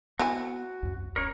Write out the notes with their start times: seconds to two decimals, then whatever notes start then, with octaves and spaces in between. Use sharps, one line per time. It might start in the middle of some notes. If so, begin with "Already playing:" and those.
0.19 B3 C4 E4 F#4 G#5
0.83 C2 F#2
1.16 D1 C#4 A#4 C#5